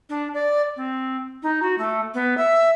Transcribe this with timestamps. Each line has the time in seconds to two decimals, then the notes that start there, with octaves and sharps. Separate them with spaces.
0.09 D4
0.34 D5
0.76 C4
1.43 D#4
1.62 F#4
1.78 A3
2.14 B3
2.37 E5